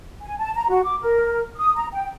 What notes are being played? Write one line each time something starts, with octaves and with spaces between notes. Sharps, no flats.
G#5
A5
A#5
F#4
D6
A#4
D#6
A#5
G5